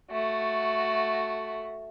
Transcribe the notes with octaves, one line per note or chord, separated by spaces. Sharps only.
A3 F#4